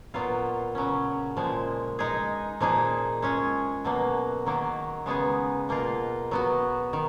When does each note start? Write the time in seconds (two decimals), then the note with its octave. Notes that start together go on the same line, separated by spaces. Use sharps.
0.14 A#2 F#3 B3 F4
0.75 C#3 F#3 C#4
1.37 A#2 F3 G#3
1.99 G#3 D#4 G#4
2.60 A#2 F3 A#3 D#4 G#4
3.22 G#3 C#4 G#4
3.85 B2 F#3 A#3
4.46 D#3 F#3 A#3
5.06 C#3 G#3 B3 D#4 G#4
5.69 B2 A#3 F4
6.31 F#3 B3 F#4
6.93 D#3